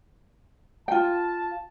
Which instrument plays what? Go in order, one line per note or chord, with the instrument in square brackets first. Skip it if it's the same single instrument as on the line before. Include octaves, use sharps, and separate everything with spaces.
[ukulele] F4 G5 [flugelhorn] A5